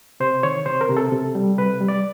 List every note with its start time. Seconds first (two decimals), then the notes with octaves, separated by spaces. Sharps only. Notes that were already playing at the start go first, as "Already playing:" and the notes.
0.20 C3 C5
0.43 D#3 C#5
0.66 C3 C5
0.81 A#4
0.89 C3
0.97 A4
1.12 C3
1.35 G3
1.58 C3 B4
1.81 G3
1.88 D5